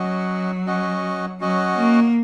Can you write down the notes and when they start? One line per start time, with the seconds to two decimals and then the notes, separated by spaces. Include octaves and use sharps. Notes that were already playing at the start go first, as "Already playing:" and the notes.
Already playing: F#3 C#4 F#4 D#5 F#5
0.66 C#4 F#4 D#5 F#5
1.40 F#3 C#4 F#4 D#5 F#5
1.77 A#3